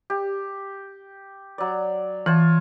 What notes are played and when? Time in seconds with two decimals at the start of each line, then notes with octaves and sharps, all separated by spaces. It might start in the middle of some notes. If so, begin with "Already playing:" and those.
0.10 G4
1.58 F#3 D5
2.26 E3 F4 C#5 A5